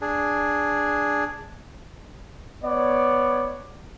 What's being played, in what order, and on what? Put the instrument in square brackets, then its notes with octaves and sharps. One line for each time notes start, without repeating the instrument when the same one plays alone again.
[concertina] D4 G#4
[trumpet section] B3 C#5 D5